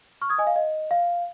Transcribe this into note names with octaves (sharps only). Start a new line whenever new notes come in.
C#6 F6
D#6 G#6
D#5 G#5
F5
D#5
F5